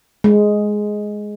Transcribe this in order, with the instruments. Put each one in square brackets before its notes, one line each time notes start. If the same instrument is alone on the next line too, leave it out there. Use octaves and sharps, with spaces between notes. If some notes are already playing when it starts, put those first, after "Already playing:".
[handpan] G#3